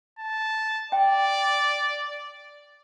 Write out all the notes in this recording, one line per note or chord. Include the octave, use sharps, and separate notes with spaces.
A5
D5 G5